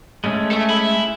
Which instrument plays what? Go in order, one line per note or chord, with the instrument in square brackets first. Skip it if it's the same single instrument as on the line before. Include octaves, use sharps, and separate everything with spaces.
[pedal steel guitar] G#3 A3 C#4
[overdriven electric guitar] A4 E5
E4